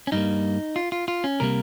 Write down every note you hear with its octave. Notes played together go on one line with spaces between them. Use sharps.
C#4
G2 G3 A#3 D#4
F4
F4
F4
C#4
C3 G3 A#3 A#4